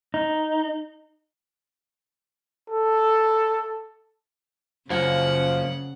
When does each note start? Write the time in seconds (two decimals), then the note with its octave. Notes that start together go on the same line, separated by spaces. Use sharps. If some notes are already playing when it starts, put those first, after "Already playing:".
0.14 D#4
2.70 A4
4.90 F#2 C#3 F3 A#3 F#5